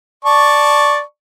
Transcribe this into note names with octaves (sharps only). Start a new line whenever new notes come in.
D5 A5 C#6